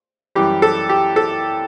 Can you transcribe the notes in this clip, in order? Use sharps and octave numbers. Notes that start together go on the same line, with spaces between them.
F#2 E3 G3 G4
A4
G4
A4